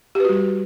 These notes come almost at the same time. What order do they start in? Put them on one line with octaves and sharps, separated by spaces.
G4 B4 F#4 G3